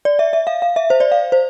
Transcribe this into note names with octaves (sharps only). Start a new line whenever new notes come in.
D5
E5
E5
F5
F5
E5
C5
D5
F5
C5